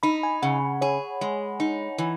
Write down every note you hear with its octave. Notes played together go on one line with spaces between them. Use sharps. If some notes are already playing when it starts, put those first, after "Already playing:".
D#4 B5
G#5
C#3 F#5
G#4 C#5
G#3
D#4
E3